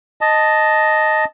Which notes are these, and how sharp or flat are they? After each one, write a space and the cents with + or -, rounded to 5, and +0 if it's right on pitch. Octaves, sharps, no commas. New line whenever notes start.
D#5 +0 A5 +0